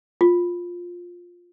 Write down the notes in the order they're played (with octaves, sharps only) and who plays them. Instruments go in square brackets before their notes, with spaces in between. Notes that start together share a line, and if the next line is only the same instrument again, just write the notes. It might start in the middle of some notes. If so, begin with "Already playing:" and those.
[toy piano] F4